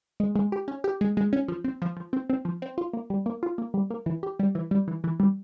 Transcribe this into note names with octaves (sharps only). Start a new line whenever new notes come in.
G#3
G#3
G4
C#4
G4
G#3
G#3
C#4
F3
C4
F3
F3
C4
C4
F3
C4
F4
A#3
G3
A#3
F4
A#3
G3
A#3
E3
G4
G3
E3
G3
E3
E3
G3